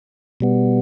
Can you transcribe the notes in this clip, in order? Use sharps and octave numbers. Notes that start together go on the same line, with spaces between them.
B2 G3 B3